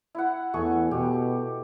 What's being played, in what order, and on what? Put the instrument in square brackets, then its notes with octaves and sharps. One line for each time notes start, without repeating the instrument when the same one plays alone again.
[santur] E4 F#5
[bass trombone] E2 [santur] A3 G#4 C#6
[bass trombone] B2 [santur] G4